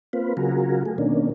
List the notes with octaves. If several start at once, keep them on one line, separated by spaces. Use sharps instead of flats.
A#3 C4 F4 B4
C#3 F#3 F4 F#4 G#4 A#4
A3 G#4
B2 D#3 A#3 C#4 D4